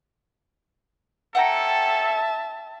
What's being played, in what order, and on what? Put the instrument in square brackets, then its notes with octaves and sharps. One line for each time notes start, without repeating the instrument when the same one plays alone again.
[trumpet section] C#4 A4 [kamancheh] E5 A5 [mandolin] F#5 G5 A#5